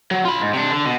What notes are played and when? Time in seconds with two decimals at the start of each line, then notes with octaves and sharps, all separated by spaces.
0.11 F#3
0.25 F4 B5
0.41 G#2
0.53 C3 D4
0.71 D3
0.85 B2